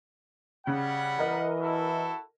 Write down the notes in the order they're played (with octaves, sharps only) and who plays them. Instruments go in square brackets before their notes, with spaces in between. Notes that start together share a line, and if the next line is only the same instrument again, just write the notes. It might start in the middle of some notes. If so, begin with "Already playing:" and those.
[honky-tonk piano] C#3 [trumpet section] G3 F#5 B5
[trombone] E3 [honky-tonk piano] A#4 D#5
[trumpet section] E4 F#4 A4